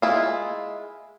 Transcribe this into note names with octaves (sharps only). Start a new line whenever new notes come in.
G#3 E4 F4